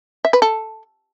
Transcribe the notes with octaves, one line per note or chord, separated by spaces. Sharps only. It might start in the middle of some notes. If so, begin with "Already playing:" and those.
E5
B4
A4